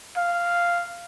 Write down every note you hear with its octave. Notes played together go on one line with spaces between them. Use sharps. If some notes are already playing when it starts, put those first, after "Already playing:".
F5